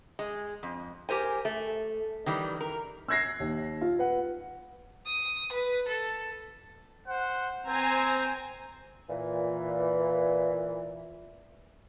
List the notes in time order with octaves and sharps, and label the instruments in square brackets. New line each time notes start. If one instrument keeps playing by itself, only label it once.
[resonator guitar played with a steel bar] G#3
F2
G4 A#4 C5 G#5
A3
D#3 E3 G3
A#4
[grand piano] E6 F#6 G#6 A#6 C7
D#2
F4
B4 F#5
[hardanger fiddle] D#6
B4
A4
[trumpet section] C5 F#5
[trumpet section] C4 [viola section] C5 G#5 A#5
[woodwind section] A#2 E3